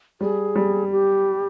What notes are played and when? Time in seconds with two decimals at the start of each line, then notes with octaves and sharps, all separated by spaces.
0.21 G3 G#4
0.56 G3
0.92 G4